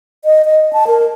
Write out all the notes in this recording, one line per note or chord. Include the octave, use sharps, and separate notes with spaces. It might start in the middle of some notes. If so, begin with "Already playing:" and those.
D#5
D#5
A5
A#4